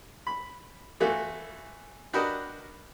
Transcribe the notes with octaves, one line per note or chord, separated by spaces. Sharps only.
B5
E3 A3 F4 F#4
D4 F#4 G4 A#4 B4 D#5